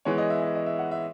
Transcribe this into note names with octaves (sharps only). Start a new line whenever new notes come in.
E3 G#3 B3 C#5
D#5
E5
D#5
D#5
E5
F#5
E5